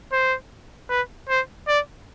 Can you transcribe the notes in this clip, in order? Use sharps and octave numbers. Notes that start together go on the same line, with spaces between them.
C5
B4
C5
D5